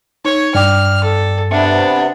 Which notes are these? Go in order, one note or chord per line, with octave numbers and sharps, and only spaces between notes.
D#4 C#5
G2 D5 G5 D6 F6
A4
C3 B3 D4 E5 C#7